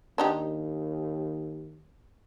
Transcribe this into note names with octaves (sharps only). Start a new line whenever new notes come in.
D#2 D4 D#4 G4